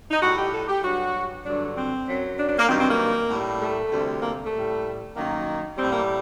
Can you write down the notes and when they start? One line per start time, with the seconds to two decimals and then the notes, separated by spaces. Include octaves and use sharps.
0.11 D#4
0.21 A2 G3 F#4
0.37 G4
0.52 A4
0.68 G4
0.83 G2 F#3 F#4
1.44 G2 D3 F#3 D4
1.76 C4
2.07 F#2 F#3
2.37 D4
2.47 D4
2.58 A#3
2.68 G2 D#3 F#3 C4
2.79 C4
2.89 A#3
3.30 A2 G3
3.61 A3
3.91 D2 C3 G3
4.22 A#3
4.43 A3
4.53 A2 G3
5.15 F#2 D#3 F#3 A#3
5.76 A2 G3 C4
5.92 A#3